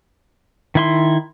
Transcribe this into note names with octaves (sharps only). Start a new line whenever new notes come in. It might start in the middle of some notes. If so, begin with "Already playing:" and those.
D#3 E4 C6